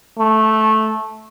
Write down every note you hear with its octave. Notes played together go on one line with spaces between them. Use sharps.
A3